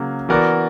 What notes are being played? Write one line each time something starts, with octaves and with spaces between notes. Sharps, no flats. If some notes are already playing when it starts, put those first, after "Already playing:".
Already playing: C#3 F#3 A#3
E3 B3 F#4 A#4 D5